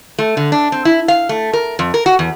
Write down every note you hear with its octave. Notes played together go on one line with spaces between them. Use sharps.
A3
D3
D4
C4
E4
F5
A3
A#4
F2
A#4
F#4
E2